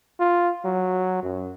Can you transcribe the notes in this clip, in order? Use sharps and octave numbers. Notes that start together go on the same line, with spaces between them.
F4
F#3
F#2